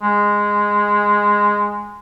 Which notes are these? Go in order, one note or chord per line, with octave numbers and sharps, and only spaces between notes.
G#3